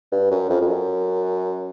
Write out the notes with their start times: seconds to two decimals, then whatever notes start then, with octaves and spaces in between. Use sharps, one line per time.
0.12 G2
0.31 F#2
0.50 F2
0.61 F2
0.68 F#2